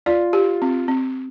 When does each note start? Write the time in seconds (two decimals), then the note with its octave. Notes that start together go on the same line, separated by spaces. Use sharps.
0.06 F4 D5
0.33 G4
0.62 C4
0.88 C4